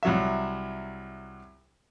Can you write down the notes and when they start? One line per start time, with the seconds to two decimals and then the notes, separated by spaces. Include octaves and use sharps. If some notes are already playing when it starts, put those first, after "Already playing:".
0.03 C2 F#3 E5